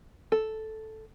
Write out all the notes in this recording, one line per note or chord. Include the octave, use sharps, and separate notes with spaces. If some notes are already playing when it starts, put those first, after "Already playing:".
A4